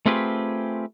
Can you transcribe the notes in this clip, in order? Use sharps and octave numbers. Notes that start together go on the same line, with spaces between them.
A3 C4 F4 G4 G#4 B4